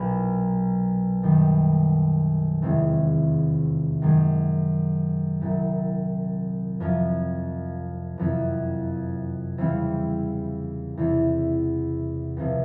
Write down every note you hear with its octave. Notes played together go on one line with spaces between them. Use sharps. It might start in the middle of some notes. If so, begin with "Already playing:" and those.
Already playing: B1 A#2 F#3 A#3
F#2 D#3 G3
F1 E2 C3 D#3 G#3
F#2 D#3 G#3
C2 A#2 F#3
F2 C3 F3
F#1 F2 C3 E3
E2 C#3 E3 G3 C4
E2 C3 E3
C#2 C3 F3